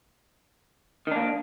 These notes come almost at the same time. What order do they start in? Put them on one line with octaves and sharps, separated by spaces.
D#3 D4 A#3